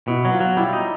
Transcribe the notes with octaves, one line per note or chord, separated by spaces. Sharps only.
B2 E4
F#3
F4
F#3
G3 E4
D#4